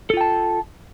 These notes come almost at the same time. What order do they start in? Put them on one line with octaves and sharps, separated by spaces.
A4 F4 G5 A5